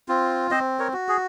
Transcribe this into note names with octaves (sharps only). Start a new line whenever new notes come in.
C4 F4
C4 C5 D#5
A#4 C#5
F#4
G#4